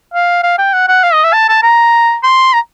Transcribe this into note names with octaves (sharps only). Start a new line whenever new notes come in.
F5
F5
G5
F#5
F#5
F5
D#5
E5
A5
A5
A#5
C6
A#5